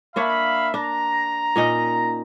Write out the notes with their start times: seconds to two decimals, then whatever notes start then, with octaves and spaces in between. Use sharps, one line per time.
0.16 A#3 D4 C#5 E5 F5 B5
0.74 D4 A#5
1.56 A#2 C#4 D#4